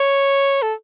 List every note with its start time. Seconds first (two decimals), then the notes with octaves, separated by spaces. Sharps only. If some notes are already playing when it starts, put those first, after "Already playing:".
Already playing: C#5
0.62 A4